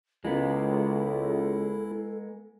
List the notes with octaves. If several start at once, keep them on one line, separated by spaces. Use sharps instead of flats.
C#2 G#3 A#3 B3 E4 A4